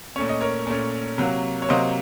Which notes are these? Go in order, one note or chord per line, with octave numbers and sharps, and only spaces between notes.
A#2 A3 C#4 C#5
D#5
A#4 C#5
A#2 A3 C#4
C3 F#3 A#3
C#5
C3 F#3 A#3 C5 D#5